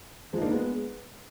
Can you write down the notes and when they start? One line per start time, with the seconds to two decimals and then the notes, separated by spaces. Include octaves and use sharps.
0.33 F3 G#3
0.38 D#4
0.42 A#3 D4
0.51 G#3 B3